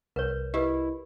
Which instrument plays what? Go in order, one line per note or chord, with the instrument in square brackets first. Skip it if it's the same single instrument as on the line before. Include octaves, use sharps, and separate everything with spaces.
[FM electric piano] C2 [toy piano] A#4 B4 C#5
[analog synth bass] E4 [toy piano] G4 [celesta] B4 D#5